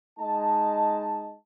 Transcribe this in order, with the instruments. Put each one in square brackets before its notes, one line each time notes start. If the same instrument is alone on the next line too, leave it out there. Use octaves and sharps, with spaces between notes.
[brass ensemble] G#3 D#4 D#5 A5